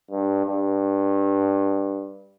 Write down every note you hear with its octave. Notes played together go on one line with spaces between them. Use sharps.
G2
G2